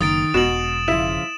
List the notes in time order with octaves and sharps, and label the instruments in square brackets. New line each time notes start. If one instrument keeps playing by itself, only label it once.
[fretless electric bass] F#1 [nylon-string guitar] D#3 [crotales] D#6 A6 D7
[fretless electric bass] E1 [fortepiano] B2 [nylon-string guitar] F#4 [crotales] E7 F#7
[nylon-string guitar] C#3 F3 [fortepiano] E4 [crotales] E7